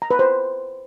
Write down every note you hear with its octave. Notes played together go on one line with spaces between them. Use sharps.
A#5
B4
C5